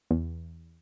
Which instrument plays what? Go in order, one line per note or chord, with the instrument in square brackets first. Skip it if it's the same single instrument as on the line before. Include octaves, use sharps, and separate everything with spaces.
[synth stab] E2